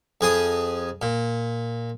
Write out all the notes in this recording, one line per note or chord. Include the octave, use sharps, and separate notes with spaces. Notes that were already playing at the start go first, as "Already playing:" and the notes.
F2 G#4 D#6
A#2